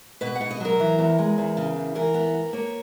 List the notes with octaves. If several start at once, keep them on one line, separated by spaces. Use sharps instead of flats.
B2 B4
F#5
B2
D#5
F#3 A#4
E3
E2
G#3
E2
C#3
E2
E3 A#4
B3
B3
A#3 C#5